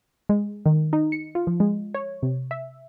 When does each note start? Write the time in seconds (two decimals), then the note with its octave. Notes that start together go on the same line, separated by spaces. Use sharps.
0.29 G#3
0.66 D#3
0.93 D#4
1.12 C#7
1.35 F4
1.47 F3
1.60 G#3
1.94 C#5
2.23 C3
2.51 E5